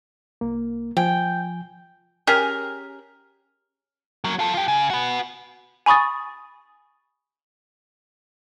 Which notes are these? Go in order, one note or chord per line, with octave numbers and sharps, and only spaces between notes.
C2 A#3
F3 G5 G#5
C#4 G4 G#4 A#4
F#3 A#3
F4 A4
F4 G4
C#3
F#4 B4
G#5 B5 C#6 D#6 A6